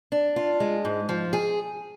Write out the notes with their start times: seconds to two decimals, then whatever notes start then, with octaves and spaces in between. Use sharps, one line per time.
0.12 D4
0.36 F4
0.60 G#3
0.85 G#2
1.09 F3
1.33 G#4